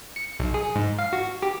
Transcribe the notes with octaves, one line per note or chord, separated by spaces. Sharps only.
C#7
B1
G#4
G#2
F5
F#4
G4